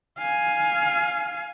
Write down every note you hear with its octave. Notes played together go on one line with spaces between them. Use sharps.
F5 G#5